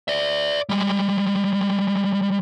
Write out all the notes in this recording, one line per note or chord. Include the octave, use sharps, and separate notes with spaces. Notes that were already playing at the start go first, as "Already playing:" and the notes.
D5 E5
G3 G#3